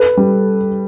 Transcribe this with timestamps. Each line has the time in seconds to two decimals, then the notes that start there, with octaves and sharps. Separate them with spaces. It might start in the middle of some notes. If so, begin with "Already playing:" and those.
Already playing: A4 B4
0.17 G3